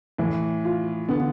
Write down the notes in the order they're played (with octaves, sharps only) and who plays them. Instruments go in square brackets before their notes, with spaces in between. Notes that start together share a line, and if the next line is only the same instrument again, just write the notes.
[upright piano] A2 [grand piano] E3
[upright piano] F4
[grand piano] D3 [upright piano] B3